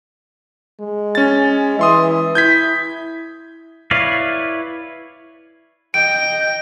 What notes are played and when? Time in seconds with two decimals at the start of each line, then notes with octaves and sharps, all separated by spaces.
0.80 G#3
1.15 C#4 A6
1.79 E3 E5 C6 D#6
2.35 E4 G6 G#6 B6
3.91 E4 B4 C#5 D5 F5
5.94 D#5 G5 D7